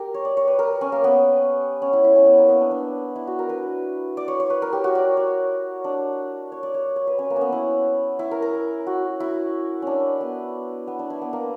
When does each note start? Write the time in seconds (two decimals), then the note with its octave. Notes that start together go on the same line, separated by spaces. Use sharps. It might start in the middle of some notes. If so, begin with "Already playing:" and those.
Already playing: G4 A#4
0.14 C#5
0.25 D5
0.37 C#5
0.47 B4
0.59 A#4
0.81 C#4
0.92 A#3
1.04 B3
1.82 C#4
1.93 E4
2.04 E4
2.16 C#4
2.26 B3
2.38 A#3
2.49 B3
2.60 D4
2.71 D4
3.16 E4
3.27 F#4
3.39 A#4
3.49 B4
4.17 D5
4.28 C#5
4.40 C#5
4.50 B4
4.62 A#4
4.73 G4
4.84 F#4
4.95 D5
5.17 C#5
5.84 D4
6.52 C#5
6.63 D5
6.74 C#5
6.96 C#5
7.07 B4
7.19 C#4
7.30 A#3
7.36 C#4
7.41 B3
7.53 E4
8.19 E4
8.31 A#4
8.42 A#4
8.87 F#4
9.20 E4
9.82 C#4 D4
10.21 B3
10.87 B3
10.99 D4
11.10 E4
11.22 B3
11.33 A#3